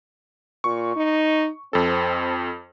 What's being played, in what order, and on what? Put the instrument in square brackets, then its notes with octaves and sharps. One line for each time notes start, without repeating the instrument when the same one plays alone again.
[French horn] A#2 [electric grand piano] C#6
[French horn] D#4
[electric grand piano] F2 A4 [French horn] C4